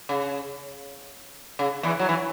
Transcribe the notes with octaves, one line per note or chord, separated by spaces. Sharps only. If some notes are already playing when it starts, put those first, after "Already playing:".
C#3
C#3
E2 E3
F#3
E3